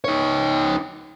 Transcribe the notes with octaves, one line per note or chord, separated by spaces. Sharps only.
D#4 C#5